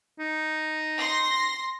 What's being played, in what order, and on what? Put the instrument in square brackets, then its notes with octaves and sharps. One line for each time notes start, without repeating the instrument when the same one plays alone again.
[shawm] D#4
[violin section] C6 A#6 C7